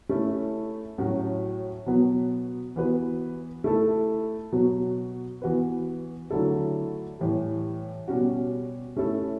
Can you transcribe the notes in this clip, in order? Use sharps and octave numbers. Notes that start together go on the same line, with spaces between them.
A3 C#4 E4 A4
A2 F#3 C#4 F#4
B2 F#3 B3
E3 B3 F#4 B4
A3 E4 A4
B2 F#3 B3 F#4
E3 B3 F#4 B4
D3 F#3 A3 E4 A4
A2 E3 G3
B2 G3 C#4 F#4
A3 C#4 E4 A4